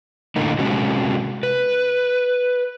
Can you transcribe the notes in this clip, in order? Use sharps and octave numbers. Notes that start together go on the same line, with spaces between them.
A2 D3 A#3 D#4
C3 G#3 C#4 F#4
B4